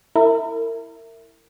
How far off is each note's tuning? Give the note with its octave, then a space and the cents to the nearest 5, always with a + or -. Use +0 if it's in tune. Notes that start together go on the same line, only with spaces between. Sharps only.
E4 +0 A#4 -30